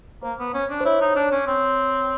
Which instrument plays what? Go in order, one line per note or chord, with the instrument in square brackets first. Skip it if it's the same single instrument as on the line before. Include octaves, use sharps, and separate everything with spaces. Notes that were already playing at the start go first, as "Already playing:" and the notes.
[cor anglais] A#3 [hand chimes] C5
[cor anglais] B3
C#4
D4
[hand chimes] C5
[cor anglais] E4 [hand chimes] C#5
[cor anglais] D#4
D4
C#4
C4